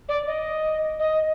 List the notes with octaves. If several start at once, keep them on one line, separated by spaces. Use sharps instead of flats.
D5
D#5
D#5